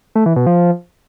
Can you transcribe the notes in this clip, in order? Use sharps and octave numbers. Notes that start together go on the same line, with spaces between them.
A3
E3
B2
F3